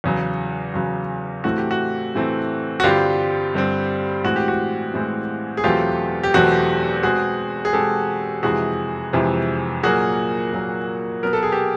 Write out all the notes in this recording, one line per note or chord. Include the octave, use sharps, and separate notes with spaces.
E2 C#3 F#3
E2 C#3 F#3
A2 E3 A3 C4 F#4
G4
F#4
A2 E3 A3 C4
F#4
G2 D3 G3 C4 F4 G4
G2 D3 G3 C4
A2 E3 G#3 C4 F#4
G4
F#4
A2 E3 G#3 C4
G#4
E2 B2 F#3 A3 C4 F4 G4
G4
E2 B2 F#3 A3 C4 F#4
B2 G#3 C4 F#4 G#4
G#4
B2 G#3 C4 G4 A4
F2 C3 E3 G#3 F#4 G#4
F2 C3 E3 G#3
A#2 F#3 A#3 F#4 G#4
A#2 F#3 A#3
B2 F#3 B3 A#4
A4
G#4
G4 A4